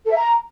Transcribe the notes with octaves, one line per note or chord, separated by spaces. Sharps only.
A4
E5
A#5